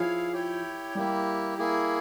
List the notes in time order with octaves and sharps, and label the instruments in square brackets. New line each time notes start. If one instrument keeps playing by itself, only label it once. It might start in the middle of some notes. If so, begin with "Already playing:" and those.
Already playing: [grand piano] F3 [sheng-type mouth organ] E4 G#4 C#5 F5
[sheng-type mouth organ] E4 G4 C#5 G5
[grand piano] G3 [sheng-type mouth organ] A#3 E4 G4
[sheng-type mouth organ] A#3 E4 G#4